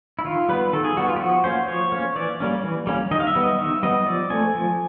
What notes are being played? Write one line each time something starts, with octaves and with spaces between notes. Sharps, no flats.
E4
D#3 F4
G3 B3 B4
D#3 A4
G#4
G3 B3 F#4
F4
G4
F3 F#4
A#3 C#4 C5
F3 C#5
A#3 C#4
E3 D5
G3 A#3 C#4
E3
G3 A#3 C#4
D#3 D#5
F5
E5
G3 B3
D#5
D#3 E5
G3 B3 D#5
F3 D5
A3 C4 G#5
F3